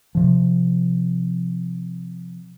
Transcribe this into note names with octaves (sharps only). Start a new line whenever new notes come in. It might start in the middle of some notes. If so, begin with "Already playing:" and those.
C3 F3